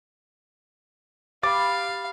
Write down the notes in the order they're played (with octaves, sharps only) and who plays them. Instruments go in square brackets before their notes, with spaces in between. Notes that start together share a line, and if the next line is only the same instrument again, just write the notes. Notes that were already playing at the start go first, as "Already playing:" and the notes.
[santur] G4 B5 [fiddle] F5 [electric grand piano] D6 A6